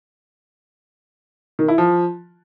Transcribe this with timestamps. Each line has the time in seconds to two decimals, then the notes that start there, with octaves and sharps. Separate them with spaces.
1.59 D#3
1.68 E4
1.78 F3